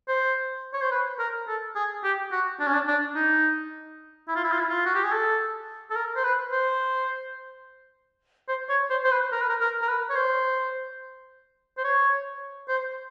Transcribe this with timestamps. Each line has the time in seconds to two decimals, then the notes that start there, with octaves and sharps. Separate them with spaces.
0.08 C5
0.73 C#5
0.82 C5
0.91 B4
1.19 A#4
1.48 A4
1.76 G#4
2.04 G4
2.32 F#4
2.60 D4
2.67 C#4
2.74 D4
2.88 D4
3.16 D#4
4.28 E4
4.36 F4
4.44 E4
4.52 F4
4.59 E4
4.69 F4
4.86 F#4
4.95 G4
5.03 G#4
5.12 A4
5.91 A4
5.96 A#4
6.16 C5
6.24 B4
6.52 C5
8.48 C5
8.69 C#5
8.90 C5
9.04 C5
9.11 B4
9.32 A#4
9.41 B4
9.50 A#4
9.61 A#4
9.82 A#4
9.88 B4
10.10 C#5
10.16 C5
11.77 C5
11.84 C#5
12.69 C5